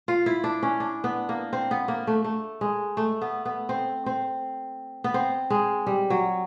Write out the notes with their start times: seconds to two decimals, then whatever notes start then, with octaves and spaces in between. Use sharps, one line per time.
0.08 F4
0.26 E4
0.44 D4
0.63 C#4
0.80 D4
1.04 B3
1.29 A#3
1.53 C4
1.71 B3
1.88 A#3
2.07 A3
2.24 A3
2.61 G#3
2.97 A3
3.22 B3
3.45 B3
3.69 C4
4.06 C4
5.04 B3
5.14 C4
5.50 G#3
5.87 G3
6.10 F#3